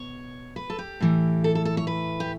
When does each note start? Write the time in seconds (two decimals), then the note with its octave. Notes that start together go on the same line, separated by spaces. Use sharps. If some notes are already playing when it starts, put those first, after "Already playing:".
Already playing: B2 C#5
0.56 B4
0.70 A4
0.79 G4
1.00 A2 E3
1.44 A4
1.55 A4
1.65 A4
1.77 C#5
1.87 B4
2.20 G4